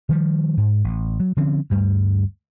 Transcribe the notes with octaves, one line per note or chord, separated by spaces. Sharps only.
D#3 F3 G3
G#2
A1
F#3
D3 F3 C4 C#4
D2 G2 G3 A3